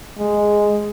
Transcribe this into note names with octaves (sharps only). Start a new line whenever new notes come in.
G#3